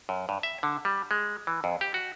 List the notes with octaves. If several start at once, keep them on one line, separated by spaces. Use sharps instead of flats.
F#2
G2
E5
D3
G3
G#3
E3
F2
G4
F#4